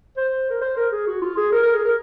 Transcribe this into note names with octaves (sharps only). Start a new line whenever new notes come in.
C5
A#4
C5
A#4
G#4
F#4
F4
G#4
A#4
A#4
G#4
A#4